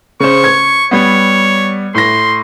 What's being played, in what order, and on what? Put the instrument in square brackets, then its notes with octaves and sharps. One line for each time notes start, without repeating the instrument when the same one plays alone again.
[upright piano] C#3 C5 [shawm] C#6
[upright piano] G#6
[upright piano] G3 B3 [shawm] C#5
[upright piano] A2 A#6 [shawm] C6